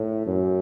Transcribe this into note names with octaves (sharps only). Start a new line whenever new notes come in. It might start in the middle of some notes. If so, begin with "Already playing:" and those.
Already playing: A2
F#2